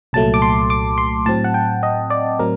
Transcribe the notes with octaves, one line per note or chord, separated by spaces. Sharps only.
C2 A#2 F#3 A3 A5
D6
C6
D6
C6
A2 F#3 C4 A5
F#5
G5
D#5
D5
A2 F#3 C4 A#4